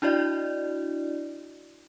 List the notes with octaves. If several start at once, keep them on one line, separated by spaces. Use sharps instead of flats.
D4 E4 F#4 D5 D#5